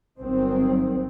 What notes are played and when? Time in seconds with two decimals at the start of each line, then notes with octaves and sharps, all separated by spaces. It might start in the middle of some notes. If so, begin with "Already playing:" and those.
0.18 G1 D#3 F#3 C4